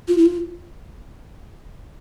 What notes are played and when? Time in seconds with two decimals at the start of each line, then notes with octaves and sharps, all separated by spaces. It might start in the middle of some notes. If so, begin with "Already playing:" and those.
0.08 F4
0.18 E4
0.26 F4